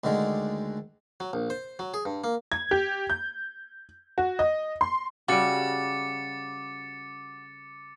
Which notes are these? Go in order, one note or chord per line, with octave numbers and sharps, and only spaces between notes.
D2 D3 D#3 G#3
F#3
A#1
C5
F#3
G#4
G2
A#3
G#6
G4
G6
F#4
D#5
C6
C#3 G3 F#4 D6 A6 C#7